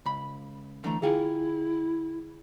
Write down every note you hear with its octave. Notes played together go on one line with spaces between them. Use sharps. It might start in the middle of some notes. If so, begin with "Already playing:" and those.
C#2 B5
D3 E3 A3 A#5
D3 E4 F4 G#4 F5 G5 G#5